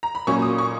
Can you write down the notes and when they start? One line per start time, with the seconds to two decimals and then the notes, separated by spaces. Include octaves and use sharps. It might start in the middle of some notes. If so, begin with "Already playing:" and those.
0.03 A#5
0.15 B5
0.27 A#2 F#3 A#3 C#4 C#6
0.42 D#6
0.58 C#6